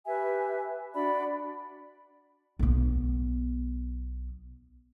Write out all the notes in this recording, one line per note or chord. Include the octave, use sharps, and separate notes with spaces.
G4 B4 E5 G#5
D4 F#4 D5 B5
B1 B3